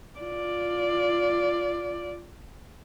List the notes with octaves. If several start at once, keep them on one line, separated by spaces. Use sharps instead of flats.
F4 D5